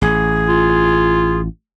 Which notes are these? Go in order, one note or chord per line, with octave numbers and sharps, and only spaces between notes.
A1 G#4
F4